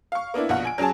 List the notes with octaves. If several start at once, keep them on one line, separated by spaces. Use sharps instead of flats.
F5 C#6
A#3 B3 D4 E4
A#1 B2 F4 F#5
G#5 D7
F#3 C#4 G#4 G#5 A5